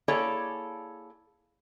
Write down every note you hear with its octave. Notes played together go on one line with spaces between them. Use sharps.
A#3 E4 G#4 A4 C#5 D5